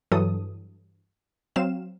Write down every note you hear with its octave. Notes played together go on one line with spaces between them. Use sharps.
G2 E3 F#3 A4 D#6
F#3 C4 F5 E7